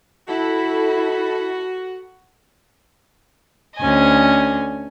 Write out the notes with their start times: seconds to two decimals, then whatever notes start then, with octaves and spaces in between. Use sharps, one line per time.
0.28 E4 F#4 A4 B5
3.78 D2 C#4 D#5 G#5